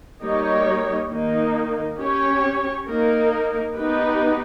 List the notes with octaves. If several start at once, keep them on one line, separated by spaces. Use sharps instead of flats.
G3 A#3 D#4 G4 C#5
D#3 A#3 D#4
C#4 G4 C#5
A#3 D#4 A#4
B3 D#4 G4 B4